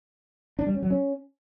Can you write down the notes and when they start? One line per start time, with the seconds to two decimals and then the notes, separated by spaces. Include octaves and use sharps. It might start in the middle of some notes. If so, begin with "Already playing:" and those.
0.59 D4
0.67 G3
0.74 C#4
0.82 F#3
0.90 C#4